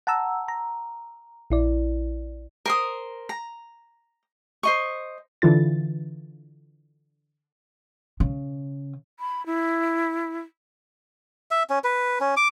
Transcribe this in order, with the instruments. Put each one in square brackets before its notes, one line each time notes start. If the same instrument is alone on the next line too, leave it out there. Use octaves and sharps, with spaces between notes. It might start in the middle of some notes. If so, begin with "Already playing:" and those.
[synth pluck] F#5 A5 A#5 E6
A#5
A#1 E4 D5
[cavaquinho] A#4 C5 D#6
A#5
C5 D#5 C#6
[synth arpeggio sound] D3 E3 F4 A6
[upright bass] C#3
[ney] B5
E4
[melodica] E5
C#4
B4
C#4
D6